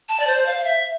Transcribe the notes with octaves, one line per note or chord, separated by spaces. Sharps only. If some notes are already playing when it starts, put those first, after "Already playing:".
A5
D5
C5
F5
F5
E5